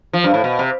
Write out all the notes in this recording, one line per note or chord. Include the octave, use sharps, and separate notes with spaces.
F3
G2
A2
B2
C3